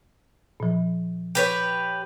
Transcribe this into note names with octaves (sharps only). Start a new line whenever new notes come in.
A#2 F3
G4 B4 C#5